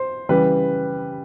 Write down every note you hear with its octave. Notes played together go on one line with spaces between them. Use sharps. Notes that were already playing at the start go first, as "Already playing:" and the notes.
Already playing: C5
C#3 E3 G3 B4